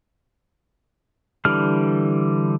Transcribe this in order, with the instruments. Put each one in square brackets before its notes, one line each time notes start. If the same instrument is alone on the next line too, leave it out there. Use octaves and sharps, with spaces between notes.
[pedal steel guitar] D3 E3 G3 F6